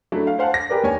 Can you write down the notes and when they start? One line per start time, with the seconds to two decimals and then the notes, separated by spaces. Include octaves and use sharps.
0.12 F#3 A3 D4 E4
0.27 F5
0.39 C5 F5 F#5 G#5 A5
0.54 A#6
0.69 G4 G#4 A#4 B4 D5
0.83 D#2 C#5 G#5